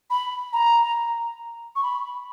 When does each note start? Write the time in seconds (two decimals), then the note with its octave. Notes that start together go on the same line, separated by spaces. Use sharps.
0.10 B5
0.53 A#5
1.76 C#6
1.83 B5